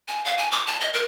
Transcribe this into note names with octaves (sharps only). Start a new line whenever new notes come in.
G#5
F5
G#5
D6
A5
D#5
A#4